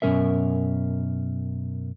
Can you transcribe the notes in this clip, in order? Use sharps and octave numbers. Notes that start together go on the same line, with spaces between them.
F#2 B2 E3 C#4 A#4 E5